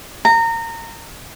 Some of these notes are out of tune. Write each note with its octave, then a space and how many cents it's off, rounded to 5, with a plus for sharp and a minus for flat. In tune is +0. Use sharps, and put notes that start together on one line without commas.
A#5 -25